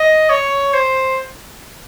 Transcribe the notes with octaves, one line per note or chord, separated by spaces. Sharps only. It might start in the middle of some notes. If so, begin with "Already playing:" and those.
Already playing: D#5
C#5
C5